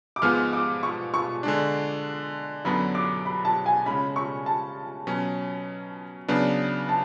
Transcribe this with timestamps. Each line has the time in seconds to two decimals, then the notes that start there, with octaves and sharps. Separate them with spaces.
0.16 D6
0.22 G#2 F3 G#3 B3 F6
0.53 D6
0.83 C#6
1.14 C#6
1.43 D3 G#3 D4
2.65 F#2 D3 F#3 B3 D4 B5
2.95 D6
3.25 B5
3.45 A5
3.66 G#5
3.86 C#3 G#3 C#4 B5
4.16 C#6
4.46 A5
5.07 B2 F#3 C#4
6.28 C#3 F#3 B3 D4
6.89 A5